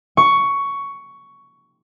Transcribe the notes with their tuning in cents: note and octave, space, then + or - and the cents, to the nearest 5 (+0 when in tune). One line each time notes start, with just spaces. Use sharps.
C#6 +10